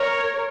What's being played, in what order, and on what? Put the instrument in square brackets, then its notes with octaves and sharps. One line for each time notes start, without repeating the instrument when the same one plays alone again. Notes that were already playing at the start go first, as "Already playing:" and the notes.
Already playing: [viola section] A#4 C#5